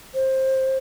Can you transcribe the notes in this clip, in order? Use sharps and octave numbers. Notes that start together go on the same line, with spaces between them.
C5